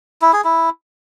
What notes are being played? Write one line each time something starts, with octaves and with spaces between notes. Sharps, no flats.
E4
G#4
E4